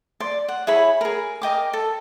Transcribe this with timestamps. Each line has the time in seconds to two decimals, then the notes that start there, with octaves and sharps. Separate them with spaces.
0.20 D5 C6
0.48 F#5
0.67 E4 G#4 C#5 B5
1.01 G#4 A#4
1.42 A#4 D#5 G5 D6
1.73 A4